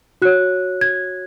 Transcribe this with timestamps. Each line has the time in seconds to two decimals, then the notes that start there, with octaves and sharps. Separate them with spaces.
0.22 F#4 C#5 F#6
0.81 G#6